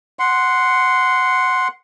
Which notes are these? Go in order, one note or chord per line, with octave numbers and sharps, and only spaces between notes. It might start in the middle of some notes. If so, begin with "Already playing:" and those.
F#5 C6